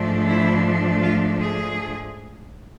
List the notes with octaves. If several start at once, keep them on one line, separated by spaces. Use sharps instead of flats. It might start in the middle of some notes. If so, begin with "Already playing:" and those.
Already playing: G#2 F3 A3 D4
E4
F4
G#4